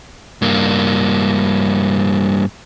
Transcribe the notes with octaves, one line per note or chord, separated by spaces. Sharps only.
G2 A#3